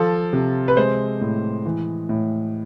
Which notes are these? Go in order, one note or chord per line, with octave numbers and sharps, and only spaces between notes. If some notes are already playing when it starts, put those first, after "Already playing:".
Already playing: F3 A4
C3
B4
G#3 C5
A2
E3
A2